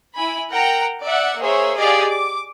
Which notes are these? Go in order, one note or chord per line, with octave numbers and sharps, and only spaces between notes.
E4 G#5 B5
A#4 F#5 G5 A#5
D5 E5 F#5
A#3 G#4 C5 C#5 E5
G4 G#4 D5 D#5 F5
D6